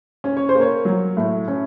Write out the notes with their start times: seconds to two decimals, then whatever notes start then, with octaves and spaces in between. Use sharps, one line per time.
0.24 C#4
0.37 C#5
0.49 C5
0.55 A#3
0.61 C#5
0.85 F#3
1.17 A2
1.48 C#4